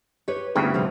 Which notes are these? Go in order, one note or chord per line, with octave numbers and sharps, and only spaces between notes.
G4 B4 C#5
D2 G2 C#3 B3 E4 G5
C3 F3 G3